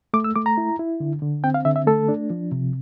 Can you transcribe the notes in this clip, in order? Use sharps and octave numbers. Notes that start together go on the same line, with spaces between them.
A3 D6
E6
A3 D6
A#5
E4
E4
D3
D3
C4 G5
F5
D3 E5
E5
A3 A4
D4
F3
C3